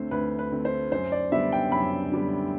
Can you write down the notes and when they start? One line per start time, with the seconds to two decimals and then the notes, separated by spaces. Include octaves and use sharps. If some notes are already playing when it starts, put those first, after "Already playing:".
Already playing: D2 D3 A3 C4 C5
0.11 D2 B4
0.39 B4
0.52 D3 A3 C4
0.65 C5
0.92 F#2 C5
1.12 D5
1.32 D3 G3 B3 E5
1.52 G5
1.72 F#2 B5
2.12 D3 G3 B3